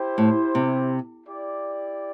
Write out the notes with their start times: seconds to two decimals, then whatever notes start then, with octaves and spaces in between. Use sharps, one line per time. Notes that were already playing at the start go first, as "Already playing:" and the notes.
Already playing: E4 G4 C5 G5
0.18 A2
0.55 C3
1.26 E4 G4 D5